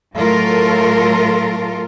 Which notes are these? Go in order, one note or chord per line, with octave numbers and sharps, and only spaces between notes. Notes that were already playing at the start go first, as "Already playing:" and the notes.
A2 F#3 A3 F4 A4 A#4